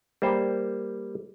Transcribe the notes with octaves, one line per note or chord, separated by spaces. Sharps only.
G3 A#3 C5